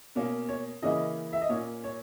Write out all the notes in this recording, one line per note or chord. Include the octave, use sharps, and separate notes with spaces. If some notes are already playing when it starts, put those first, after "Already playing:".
B2 A#3 C#4
C#5
C#3 E3 A#3 C#4 D#5
E5
D#5
A#2 A#3 C#4 C#5
C#5